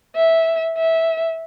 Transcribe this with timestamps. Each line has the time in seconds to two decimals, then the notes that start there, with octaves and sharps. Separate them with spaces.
0.16 E5
0.77 E5